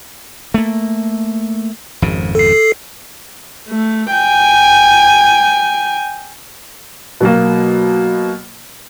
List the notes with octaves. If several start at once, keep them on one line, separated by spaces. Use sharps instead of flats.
A3 A#3
G#1 F2 C#3
A4 C7
A3
G5 G#5
B2 F#3 A#3